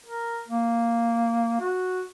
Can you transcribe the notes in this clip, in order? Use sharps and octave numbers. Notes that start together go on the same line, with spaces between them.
A#4
A#3
F#4